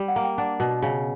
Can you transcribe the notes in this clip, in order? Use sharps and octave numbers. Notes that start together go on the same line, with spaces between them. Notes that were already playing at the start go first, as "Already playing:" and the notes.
Already playing: G3
F#5
A#3
G5
D4 F#5
B2
C#3